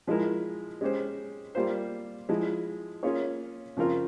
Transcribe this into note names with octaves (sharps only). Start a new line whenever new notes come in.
F3 G#3 E4 A#4
G#3 C#4 G4 C5
G3 A#3 F4 C5
F3 G#3 E4
A#3 C#4 F4 G#4 C#5
C#3 F3 C4 F4 A#4